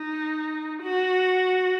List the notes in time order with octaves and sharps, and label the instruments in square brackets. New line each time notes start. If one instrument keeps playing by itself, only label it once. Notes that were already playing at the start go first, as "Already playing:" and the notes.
Already playing: [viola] D#4
F#4